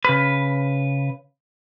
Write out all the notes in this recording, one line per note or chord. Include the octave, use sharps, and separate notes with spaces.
C#3 B4